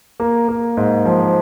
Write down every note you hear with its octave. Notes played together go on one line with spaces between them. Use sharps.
A#3
A#3
G#2
F3